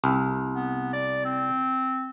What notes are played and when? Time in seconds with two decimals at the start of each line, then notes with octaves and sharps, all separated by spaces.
0.04 C2
0.54 B3
0.93 D5
1.25 C4